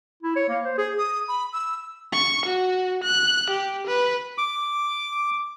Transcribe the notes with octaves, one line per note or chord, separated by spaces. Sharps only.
E4
C#5
A#3
C5
G#4
D#6
B5
E6
C#6
F#4
F#6
G4
B4
D6